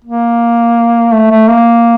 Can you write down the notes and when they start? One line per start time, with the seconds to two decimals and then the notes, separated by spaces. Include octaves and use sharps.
0.04 A#3
1.13 A3
1.31 A3
1.49 A#3